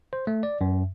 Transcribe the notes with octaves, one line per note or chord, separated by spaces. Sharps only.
C5
A3
D5
F#2